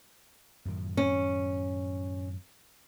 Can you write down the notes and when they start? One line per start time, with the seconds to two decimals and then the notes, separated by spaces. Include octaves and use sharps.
0.65 F#2 A2 D#3
0.97 C#4